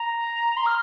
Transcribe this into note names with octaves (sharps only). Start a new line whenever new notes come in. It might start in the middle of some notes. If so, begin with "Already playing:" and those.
Already playing: A#5
C6
F6